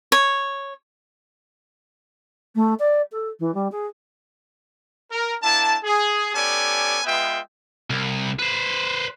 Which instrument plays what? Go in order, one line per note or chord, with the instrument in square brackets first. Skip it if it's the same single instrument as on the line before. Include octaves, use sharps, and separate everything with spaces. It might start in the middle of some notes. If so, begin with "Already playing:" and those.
[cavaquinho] C#5
[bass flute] A3
D5
A4
E3
G3
G#4
[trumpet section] A#4
A#3 D4 E4 A5
G#4
B3 C#4 G4 A4 D5 G#5
G#3 B3 F4 B4 E5 G5
[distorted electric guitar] C2
B4 C5